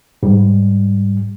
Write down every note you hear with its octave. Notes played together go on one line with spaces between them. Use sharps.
G#2 G3